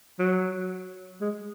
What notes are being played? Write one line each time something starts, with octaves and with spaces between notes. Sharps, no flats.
F#3
G#3